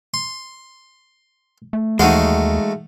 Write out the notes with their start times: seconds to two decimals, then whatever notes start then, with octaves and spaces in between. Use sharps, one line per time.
0.14 C6
1.73 A3
1.99 D#2 E3 G#3 A3 D#4 F#4 F5 F#5